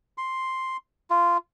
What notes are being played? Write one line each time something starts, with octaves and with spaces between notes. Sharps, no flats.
C6
F4